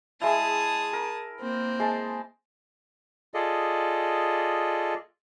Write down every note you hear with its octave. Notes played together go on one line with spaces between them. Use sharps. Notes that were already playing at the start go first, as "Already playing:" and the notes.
G#3 E4 G#4 A5 D#6
A#4
A#3 C4
G#3 A5
F4 G#4 A4 D5 D#5